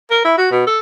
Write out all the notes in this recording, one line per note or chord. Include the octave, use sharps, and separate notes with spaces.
A#4
E4
F#4
B2
A4